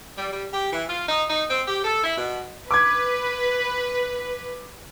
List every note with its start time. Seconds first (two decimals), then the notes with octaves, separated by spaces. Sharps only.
0.17 G3
0.32 G3
0.53 G4
0.73 E3
0.88 F4
1.09 D#4
1.30 D#4
1.49 C4
1.68 G4
1.84 A4
2.04 E4
2.18 B2
2.71 B4 D6 G#6